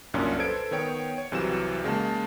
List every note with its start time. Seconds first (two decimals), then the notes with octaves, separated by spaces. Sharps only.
0.14 C2 F#2 A#2 C#4 D4
0.39 A4 B4 C5 G#6 D7
0.71 D#3 B3 C#5 G5 D7
1.18 C#5
1.32 C2 C3 E3 F#3 E7
1.84 C#3 G#3 A#3 A5